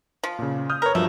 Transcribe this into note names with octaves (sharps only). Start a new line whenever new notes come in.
F3
A#2 C#3
D#6 F6 G6
A#4 B4 C#5
G2 F3 F#3 A3